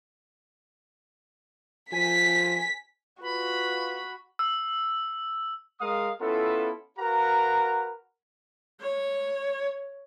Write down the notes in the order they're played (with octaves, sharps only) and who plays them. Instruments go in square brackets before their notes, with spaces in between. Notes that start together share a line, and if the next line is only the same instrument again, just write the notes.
[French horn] F3 [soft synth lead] G#5 [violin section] B6
[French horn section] F4 B4 [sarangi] F#4 [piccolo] B5
[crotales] E6
[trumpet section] G#3 A#4 F5 D#6
B3 C#4 E4 F4 A4
F#4 A#4 B4 F5 F#5 A#5
[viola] C#5